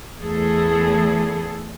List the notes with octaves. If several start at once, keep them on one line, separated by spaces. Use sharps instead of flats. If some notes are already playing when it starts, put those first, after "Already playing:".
E2 A3 G#4 A4